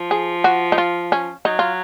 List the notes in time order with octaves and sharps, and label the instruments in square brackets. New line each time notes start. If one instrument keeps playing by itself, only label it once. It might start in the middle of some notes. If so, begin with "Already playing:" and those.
Already playing: [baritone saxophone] F3
[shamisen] G#4
F#4
D#4
F4
C#4
[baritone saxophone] F#3 [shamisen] D#4
[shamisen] F4